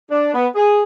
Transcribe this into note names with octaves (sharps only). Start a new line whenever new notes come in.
D4
B3
G#4